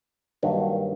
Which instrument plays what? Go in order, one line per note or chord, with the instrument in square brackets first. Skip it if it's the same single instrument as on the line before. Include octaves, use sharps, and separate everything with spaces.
[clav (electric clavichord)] G2 D#3 F#3 A#3